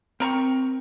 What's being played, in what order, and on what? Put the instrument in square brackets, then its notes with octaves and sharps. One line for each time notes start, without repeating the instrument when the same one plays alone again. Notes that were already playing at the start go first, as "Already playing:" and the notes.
[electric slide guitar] C4 G5 [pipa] A#4 A#5 C#6